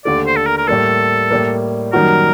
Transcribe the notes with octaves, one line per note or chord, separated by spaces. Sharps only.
D#2 D3 A3 D5
C5
A4
A#4
A#4
A2 G3 A#3 A4
A2 G3 A#3
F#2 D#3 G3 A#3 F#4 A#4